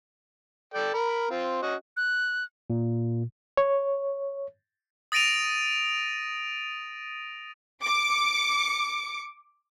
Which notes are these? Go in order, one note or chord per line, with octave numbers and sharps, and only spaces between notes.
A4 D5 G5
A#4 B5
C4 F4
C#4 F#4 D#5
F#6
A#2
C#5
D#6 A6 A#6 D7 D#7 F7
D6 C#7